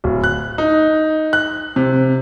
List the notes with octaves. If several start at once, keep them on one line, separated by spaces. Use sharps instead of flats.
D1
F#6
D#4
F#6
C3